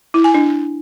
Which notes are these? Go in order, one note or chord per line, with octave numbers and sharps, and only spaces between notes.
E4
G#5
D4